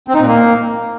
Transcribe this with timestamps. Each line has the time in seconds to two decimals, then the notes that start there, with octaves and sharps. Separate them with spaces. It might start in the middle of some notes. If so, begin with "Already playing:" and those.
0.08 C4
0.14 D#4
0.21 A#2
0.27 A#3